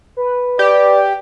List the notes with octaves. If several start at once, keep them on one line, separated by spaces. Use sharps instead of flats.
B4
G4 D5